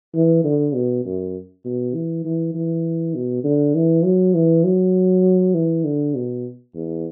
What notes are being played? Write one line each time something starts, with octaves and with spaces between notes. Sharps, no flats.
E3
D3
B2
F#2
B2
E3
E3
E3
B2
D3
E3
F#3
E3
F#3
E3
D3
B2
E2